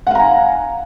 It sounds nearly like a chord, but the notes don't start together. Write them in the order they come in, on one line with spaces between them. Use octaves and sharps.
F#5 F5 A#5 G#5